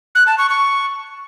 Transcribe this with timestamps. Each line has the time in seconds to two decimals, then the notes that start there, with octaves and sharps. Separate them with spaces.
0.15 F#6
0.27 A5
0.38 C#6
0.50 C#6